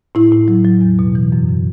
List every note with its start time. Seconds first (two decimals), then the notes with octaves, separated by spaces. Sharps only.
0.15 A2 E4
0.32 A2
0.48 F#3
0.65 F#3
0.81 E2
0.99 B2
1.15 E3
1.32 F#2
1.49 C#3